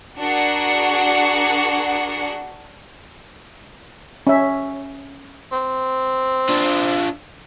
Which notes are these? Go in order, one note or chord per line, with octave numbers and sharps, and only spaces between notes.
D4 F#4 G#4 A#4 F#5 C#7
C#4 E5
C4
D4 F4